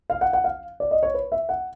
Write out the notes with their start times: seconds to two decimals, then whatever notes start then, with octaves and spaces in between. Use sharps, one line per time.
0.10 F5
0.21 F#5
0.33 F#5
0.44 F5
0.80 D5
0.91 D#5
1.03 C#5
1.14 B4
1.32 E5
1.49 F#5